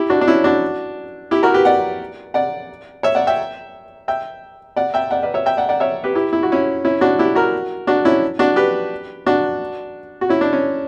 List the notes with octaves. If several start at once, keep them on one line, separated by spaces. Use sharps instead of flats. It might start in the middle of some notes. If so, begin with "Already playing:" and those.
Already playing: E4 G4
D4 F#4
D4
C#4 E4
D4 F#4
E4 G4
F#4 A#4
G4 B4
D5 F#5
D5 F#5
C#5 E5
D5 F#5
E5 G5
E5 G5
D5 F#5
E5 G5
D5 F#5
B4 D5
C#5 E5
E5 G5
D5 F#5
D5 F#5
C#5 E5
G4 B4
E4 G4
E4
F#4
C#4 E4
C#4 E4
D4 F#4
E4 G4
F#4 A#4
D4 F#4
C#4 E4
D4 F#4
G4 B4
D4 F#4
F#4
C#4 E4
D4
C#4